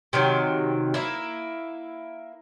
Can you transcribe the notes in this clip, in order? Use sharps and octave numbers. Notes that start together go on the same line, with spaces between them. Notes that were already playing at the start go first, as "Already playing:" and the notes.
C3 D#3 F#3
A#3 E4